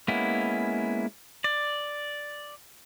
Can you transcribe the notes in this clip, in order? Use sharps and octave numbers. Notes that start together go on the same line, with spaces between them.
G#3 A#3 B3 C#4 E4
D5